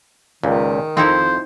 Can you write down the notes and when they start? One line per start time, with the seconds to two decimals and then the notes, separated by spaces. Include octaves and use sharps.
0.44 C#2 A#2 D#3
0.97 F2 C4 D#4 E4 C5